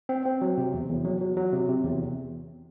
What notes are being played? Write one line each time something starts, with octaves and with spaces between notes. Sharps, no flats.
C4
C4
F#3
C3
E2
E2
F#3
F#3
F#3
C3
C3
E2